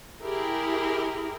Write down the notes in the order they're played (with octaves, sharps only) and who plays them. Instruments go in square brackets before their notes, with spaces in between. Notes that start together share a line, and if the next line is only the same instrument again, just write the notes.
[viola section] E4 G4 G#4 A#4